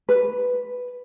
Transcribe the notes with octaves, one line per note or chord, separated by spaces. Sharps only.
B4